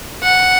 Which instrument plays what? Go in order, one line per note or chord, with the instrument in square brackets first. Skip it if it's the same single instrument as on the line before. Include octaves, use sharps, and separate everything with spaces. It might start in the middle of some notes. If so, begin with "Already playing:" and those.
[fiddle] F#5